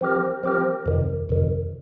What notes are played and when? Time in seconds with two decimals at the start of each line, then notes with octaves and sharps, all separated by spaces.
0.01 F3 C4 G4 A#4
0.43 F3 C4 G4 A#4
0.86 F2 C3 D#3
1.29 F2 C3 D#3